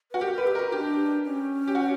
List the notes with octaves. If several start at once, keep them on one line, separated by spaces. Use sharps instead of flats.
F#4 B4
G4 A#4
A#4 B4
G4
F#4 A#4
D4 G4
C#4
G4
F#4